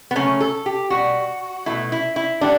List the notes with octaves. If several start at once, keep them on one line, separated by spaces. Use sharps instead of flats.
B3
C#3 F#3 A3 C#4
A4
G4
B2 G3 F#4
B2 F#3 A3 E4
E4
E4
D3 G3 D4